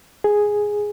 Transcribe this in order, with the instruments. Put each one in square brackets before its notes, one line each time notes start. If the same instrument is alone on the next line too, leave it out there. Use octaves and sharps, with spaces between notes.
[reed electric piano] G#4